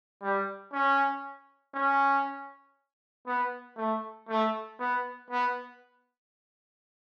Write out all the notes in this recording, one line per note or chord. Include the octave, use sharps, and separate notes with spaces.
G3
C#4
C#4
B3
A3
A3
B3
B3